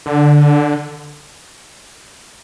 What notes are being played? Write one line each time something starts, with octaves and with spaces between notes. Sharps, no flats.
D3